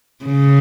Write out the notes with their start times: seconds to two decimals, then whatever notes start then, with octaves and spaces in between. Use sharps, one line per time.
0.25 C#3